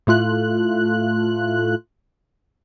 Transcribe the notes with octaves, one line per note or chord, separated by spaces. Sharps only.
A2 A3 F4 F#6